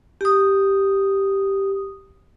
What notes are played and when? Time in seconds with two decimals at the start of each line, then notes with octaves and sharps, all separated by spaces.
0.21 G4 D#6